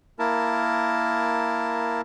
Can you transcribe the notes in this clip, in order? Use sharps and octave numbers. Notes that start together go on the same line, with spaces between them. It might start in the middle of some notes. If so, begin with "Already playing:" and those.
A#3 E4 A#4 A5